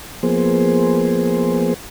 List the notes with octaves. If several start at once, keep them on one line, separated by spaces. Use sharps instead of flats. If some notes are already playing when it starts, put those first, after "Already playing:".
F3 A#3 B3 G#4 C5